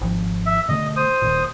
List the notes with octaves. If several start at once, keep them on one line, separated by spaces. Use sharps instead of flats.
G#1 F3
E5
B2 D3 A3 D#5
C5 D#6
D#1 D#2 A#2